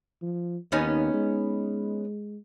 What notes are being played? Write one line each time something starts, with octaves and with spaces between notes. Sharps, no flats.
F3
D#2 B3 C#4 D#4
G#3